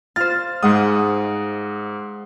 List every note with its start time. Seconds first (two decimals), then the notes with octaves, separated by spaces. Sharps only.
0.16 F4 C5 F6 A6
0.63 G#2 G#3 F#5 D#6